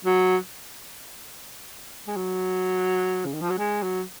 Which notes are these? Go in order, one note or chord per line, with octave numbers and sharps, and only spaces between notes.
F#3
G#3
F#3
C#3
D#3
F3
F#3
G#3
F#3